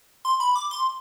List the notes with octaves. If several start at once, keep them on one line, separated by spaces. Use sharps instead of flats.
C6
B5
D6
C6